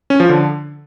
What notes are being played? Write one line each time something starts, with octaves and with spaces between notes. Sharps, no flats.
C#4
F3
D3